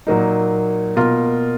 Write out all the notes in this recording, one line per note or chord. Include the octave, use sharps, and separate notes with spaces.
A#2 F#3 A#3 D#4
B2 A#3 F4 A#4